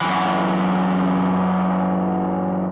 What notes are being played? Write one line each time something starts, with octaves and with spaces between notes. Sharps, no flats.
F#2 E3